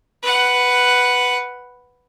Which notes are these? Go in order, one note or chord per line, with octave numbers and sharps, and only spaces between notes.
B4 F#5